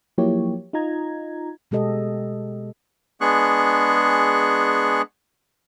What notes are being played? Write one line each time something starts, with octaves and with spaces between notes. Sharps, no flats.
F3 F#3 A#3 E4 G4 C#5
D#4 F4 D#5 A#5 G#6
B2 G#3 G4 A4 D#5
G#3 B3 D4 G#4 C#6 F#6